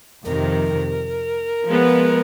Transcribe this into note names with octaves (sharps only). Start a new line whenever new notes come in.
F2 C3 D#3 A#4
F3 G#3 B3